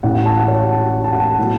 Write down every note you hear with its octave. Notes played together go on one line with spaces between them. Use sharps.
A1 A2 E3 F#5
F#5
A5
F#5
C#5
F#5
A5
A5
F#5
A5
A2 F#3 B3